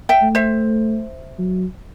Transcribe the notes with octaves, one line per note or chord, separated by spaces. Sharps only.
E5 G5
A3
C5 E5
F#3